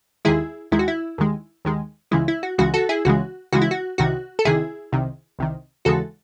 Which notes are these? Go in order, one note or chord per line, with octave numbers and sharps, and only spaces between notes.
D#2 D#3 G#3 E4 G#4
D#2 D#3 G#3 E4
F#4
E4
D#2 D#3 G#3
D#2 D#3 G#3
C#2 C#3 E3 G#3 E4
E4
F#4
C#2 C#3 E3 G#3 F#4
F#4 A4
E4 G#4
C#2 C#3 E3 G#3 F#4
C#2 C#3 E3 G#3 F#4
E4
F#4
C2 C3 D#3 F#4
A4
C2 C3 D#3 E4 G#4
C2 C3 D#3
C2 C3 D#3
D#2 C#3 E3 G#3 F#4 A4